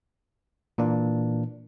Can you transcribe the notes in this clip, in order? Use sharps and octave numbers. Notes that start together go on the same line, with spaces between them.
A#2 E3 A#3 D4